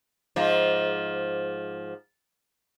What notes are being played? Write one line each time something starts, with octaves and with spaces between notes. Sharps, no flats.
G#2 F3